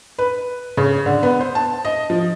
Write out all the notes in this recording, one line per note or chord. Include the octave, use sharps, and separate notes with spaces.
B4
C#3
D3
B3
C5
A5
D#5
F3